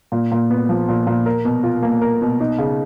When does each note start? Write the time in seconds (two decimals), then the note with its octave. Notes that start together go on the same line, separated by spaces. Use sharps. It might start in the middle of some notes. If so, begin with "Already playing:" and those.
0.12 A#2
0.32 A#2
0.50 B3
0.69 F3
0.89 A#2
1.07 A#2
1.26 A#4
1.45 B2
1.64 F4
1.83 A#3
2.01 A#4
2.22 B2
2.40 D#4
2.58 C#3